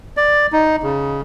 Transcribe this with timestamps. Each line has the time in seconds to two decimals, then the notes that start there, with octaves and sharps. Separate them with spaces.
0.17 D5
0.52 D#4
0.83 C#3